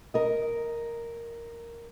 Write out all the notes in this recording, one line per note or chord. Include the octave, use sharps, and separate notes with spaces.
A#4 D#5